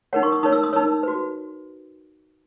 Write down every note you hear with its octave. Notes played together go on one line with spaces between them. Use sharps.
D#4 A#4 C#5 F#5
C#6
D#6
D#4 A#4 C#5 D#6
E6
D#6
D#4 A#4 C#5 E6
F#4 B4